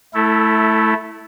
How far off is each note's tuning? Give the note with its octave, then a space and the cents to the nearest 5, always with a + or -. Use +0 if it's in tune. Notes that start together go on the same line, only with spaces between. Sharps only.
A3 -15 E4 -5 A4 +20